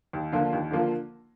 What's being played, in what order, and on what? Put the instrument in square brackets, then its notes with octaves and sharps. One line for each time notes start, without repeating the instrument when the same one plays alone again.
[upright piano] D#2
D3 F3 A#3 F4
D#2
D3 F3 A#3 F4